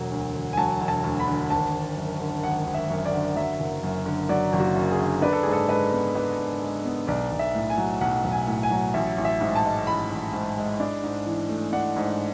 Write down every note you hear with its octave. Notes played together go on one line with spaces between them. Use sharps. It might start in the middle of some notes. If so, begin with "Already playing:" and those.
Already playing: E1 F#3
D2
D3
G#5
F#3 A5
E1
A5
D2
B5
D3
G#1 A5
G#1
F#2
D3
G#1 F#5
G#1
E5
F#2
D5
D3
F#3 E5
F#1
F#2
D3
F#3 D5
F#1
F#4
F#2
G#4
D3
D4 B4
A4
G#2 G#4
A4
G#3 B4
B3
D4 B4
G#2
G#3
B3
B1 D5
B1
E5
A2
G#5
F#3
B1 F#5
B1
G#5
A2
G#5
F#3
A1 E5
A1
E5
G#2
A5
G#3
A1 B5
A1
G#2
G#3
D4
G#2
E3
A3
D4 F#5
G#2